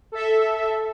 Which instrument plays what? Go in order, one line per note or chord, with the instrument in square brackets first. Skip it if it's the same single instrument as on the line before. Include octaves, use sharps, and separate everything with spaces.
[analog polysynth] A4 E5